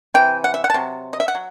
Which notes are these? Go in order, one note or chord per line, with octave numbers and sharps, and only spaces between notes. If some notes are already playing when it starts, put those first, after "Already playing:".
C3 E3 G5
F#5
E5
F#5
A5
C3 F#3
D#5
E5
F#5
F#3